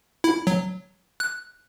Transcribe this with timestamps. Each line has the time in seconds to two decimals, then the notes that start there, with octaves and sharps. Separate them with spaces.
0.24 E4
0.47 F#3
1.20 F#6